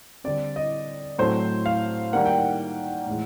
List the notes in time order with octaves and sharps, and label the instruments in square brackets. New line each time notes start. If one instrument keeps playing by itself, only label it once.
[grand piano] D3 G3 C4 D5
D#5
A2 F#3 A3 C4 C5
F5
D#3 G3 A#3 F#5
G5
F#5
A2 E3 G#3